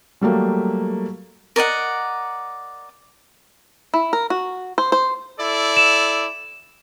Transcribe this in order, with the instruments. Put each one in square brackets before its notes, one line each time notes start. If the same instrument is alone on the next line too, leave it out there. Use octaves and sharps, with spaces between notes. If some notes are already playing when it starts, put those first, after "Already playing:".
[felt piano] F#3 G3 A3 A#3
[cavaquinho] A#4 D5 D#5 F#5
[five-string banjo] E4
A#4
F#4
C5
C5
[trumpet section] E4 A4 D5
[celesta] E7